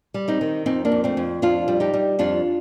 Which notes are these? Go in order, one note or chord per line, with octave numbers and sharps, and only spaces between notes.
G3
C4 D#4
D#3
F2 C4 D#4
A#3 D4
F2
A3 C4
F2
F2 D4 F4
G3
D#4 G4
G3
F2 D4 F4